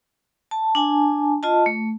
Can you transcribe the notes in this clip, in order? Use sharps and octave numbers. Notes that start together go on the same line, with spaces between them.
A5
D4 G#5 A5
F4 D#5 A5
A3